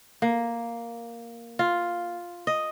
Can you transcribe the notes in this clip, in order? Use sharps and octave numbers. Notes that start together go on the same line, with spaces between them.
A#3
F4
D#5